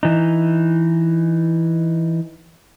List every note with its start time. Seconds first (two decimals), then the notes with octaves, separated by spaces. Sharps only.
0.03 E3 D#4